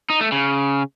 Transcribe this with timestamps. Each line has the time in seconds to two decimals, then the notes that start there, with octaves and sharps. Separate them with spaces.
0.10 D#4
0.21 A3
0.32 C#3